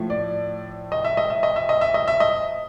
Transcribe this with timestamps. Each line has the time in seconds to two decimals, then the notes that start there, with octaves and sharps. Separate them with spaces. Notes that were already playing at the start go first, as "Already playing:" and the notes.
Already playing: A2 F3 A3
0.10 D5
0.92 D#5
1.05 E5
1.17 D#5
1.30 E5
1.43 D#5
1.56 E5
1.69 D#5
1.81 E5
1.94 D#5
2.08 E5
2.20 D#5